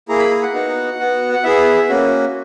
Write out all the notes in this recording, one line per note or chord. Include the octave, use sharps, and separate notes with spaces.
A#3 E4 G#4 A#5
B5
A#5
F#5
B3 D#4 F#4
B3 F#4
F#5
B3 E4 G#4 E5
A#3 C#4 F#4